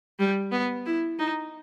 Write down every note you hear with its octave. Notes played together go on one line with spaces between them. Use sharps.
G3
B3
E4
D#4